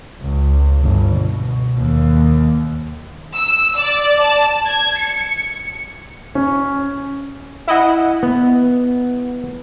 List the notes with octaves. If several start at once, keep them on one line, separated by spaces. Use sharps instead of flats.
C#2
G1
B2
D#2
E6
D5
A5
G#6
C#7
C#4
E4 D#5 F#5
B3